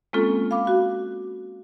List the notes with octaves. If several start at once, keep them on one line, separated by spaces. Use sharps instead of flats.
G#3 A#3 C4 C#4 F4 A4
F5 B5 D6
F#4